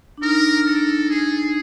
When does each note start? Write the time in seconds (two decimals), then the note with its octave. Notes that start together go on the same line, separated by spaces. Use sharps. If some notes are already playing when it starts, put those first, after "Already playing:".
0.17 D4
0.22 D#4 A#4
0.66 A4
1.10 G#4